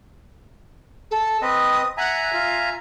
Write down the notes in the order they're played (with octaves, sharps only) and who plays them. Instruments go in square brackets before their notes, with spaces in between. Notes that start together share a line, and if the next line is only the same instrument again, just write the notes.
[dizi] A4
[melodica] C4 B4 D#5 [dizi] D#6
[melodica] E5 G#5 A#5 [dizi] F#5
[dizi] F4